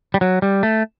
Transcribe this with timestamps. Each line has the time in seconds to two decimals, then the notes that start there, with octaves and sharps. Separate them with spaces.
0.14 G3
0.21 F#3
0.42 G3
0.63 A3